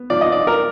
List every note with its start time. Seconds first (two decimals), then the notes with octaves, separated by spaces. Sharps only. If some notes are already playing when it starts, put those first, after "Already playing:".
Already playing: B3
0.10 F3 D5
0.21 D#5
0.32 D5
0.47 A#4